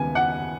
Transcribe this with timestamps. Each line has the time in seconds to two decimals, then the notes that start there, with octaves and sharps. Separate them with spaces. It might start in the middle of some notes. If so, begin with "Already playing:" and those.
Already playing: D#2 C#3 G#3 B3 G#5
0.15 F#5